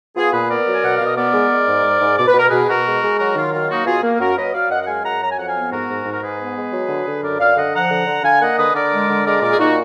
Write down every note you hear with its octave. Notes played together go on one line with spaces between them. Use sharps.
B3 F4 G#4
A#2 G#4 B4
B3 A#4 D5
F#3
G#5
B2 F#5
F5
B2 D#5
B3 A#4 D5
G#3
G#3
G#2
G#2
G#2
B2 D5
B4
B2 A#4
B2 G#4 B4
B2 F#4 A#4
G#3
G#3
F#3 F#4 A#4
D#3 F4
F#3 F4
A#3 D#4 F#4
B2 F4 G#4
A#3
F#2 F#4 A#4
F#3 B4 D#5
F#3 D5 F5
F#2 D#5 F#5
F#5
G#3 F5 G#5
F#2 F#5 A#5
F#3 A#5
G#5
F2 F#5
F5 G#5
B3
G#2 F#4 A#4
G#2
G#2
A#4
G#2 G#4 B4
B3
G#3
F#3
D3
D3
F#2 A#4 D5
F#2 D5 F5
D3 D#5 F#5
F3 F#5 A#5
D3
D3
D3 F5 G#5
A#3 D#5 F#5
D3 B4 D#5
D3 A#4 D5
G#3
D3
G#3 A#4 D5
A#2 A#4 D5
G#4
A#2 D#4 F#4